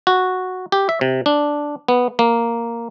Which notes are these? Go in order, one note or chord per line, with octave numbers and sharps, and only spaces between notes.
F#4
G4
E5
C3
D4
B3
A#3